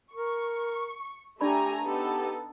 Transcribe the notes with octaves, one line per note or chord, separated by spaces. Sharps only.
A#4 C#6
A3 D4 G4 D5 G#5 A#5 B5
B3 D#4 G4 A4